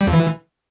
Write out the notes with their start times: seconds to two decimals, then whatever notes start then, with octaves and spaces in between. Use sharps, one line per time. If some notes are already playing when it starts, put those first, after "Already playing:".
0.01 G3
0.07 F2
0.13 E3